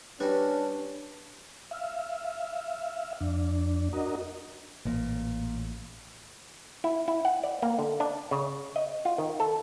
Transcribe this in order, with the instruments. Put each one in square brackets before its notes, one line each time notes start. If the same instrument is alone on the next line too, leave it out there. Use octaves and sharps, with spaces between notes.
[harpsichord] G3 F#4 [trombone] C#4 [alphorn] D4 [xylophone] B4
[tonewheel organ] E5 F5
F2 D4
D4 F#4 A#4 D#5
[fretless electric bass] A1 [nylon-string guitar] A#2
[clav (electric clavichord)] E4
E4
F#5
D5
A#3
D3
D4
C#3
D#5
F4
D#3
A4